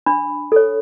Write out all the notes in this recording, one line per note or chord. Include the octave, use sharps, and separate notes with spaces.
D4 B5
A4 C#5